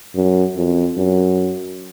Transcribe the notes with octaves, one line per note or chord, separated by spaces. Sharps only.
F#2
F2
F#2